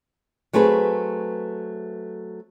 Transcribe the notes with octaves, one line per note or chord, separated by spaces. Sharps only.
F#3 A3 C4 G#4 B4